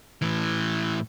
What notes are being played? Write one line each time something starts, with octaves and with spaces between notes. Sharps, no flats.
A2 E3